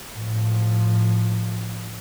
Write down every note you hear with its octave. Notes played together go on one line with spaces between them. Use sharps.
A2 F3